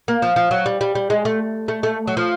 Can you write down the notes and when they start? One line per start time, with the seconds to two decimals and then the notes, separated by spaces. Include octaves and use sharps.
0.08 A#3
0.22 F3
0.36 F3
0.51 F#3
0.66 G3
0.81 G3
0.95 G3
1.10 G#3
1.25 A3
1.68 A3
1.83 A3
2.07 F#3
2.17 F3